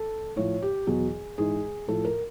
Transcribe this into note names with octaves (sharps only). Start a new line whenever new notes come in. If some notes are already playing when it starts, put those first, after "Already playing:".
Already playing: A4
A2 F3 C#5
G4
E2 B2 F#3 G#4
G#2 E3 G#4
A2 F3 A4
A#4